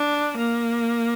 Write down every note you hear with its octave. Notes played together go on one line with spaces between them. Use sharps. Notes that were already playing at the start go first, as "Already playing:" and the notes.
Already playing: D4
A#3